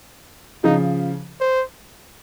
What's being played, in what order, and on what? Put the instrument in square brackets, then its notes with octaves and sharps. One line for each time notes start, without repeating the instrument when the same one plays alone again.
[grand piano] C#3 F3 [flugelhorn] D#4
[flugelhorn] C5